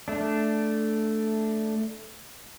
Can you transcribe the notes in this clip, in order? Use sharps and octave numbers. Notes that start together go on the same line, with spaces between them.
A3 D4